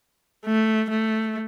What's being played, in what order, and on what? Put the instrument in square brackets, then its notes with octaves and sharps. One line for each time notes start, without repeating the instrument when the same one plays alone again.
[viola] A3
A3